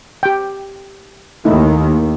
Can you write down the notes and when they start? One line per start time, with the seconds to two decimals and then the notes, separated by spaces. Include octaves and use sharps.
0.23 G4 G5
1.45 D#2 D#3 A3 D#4 E4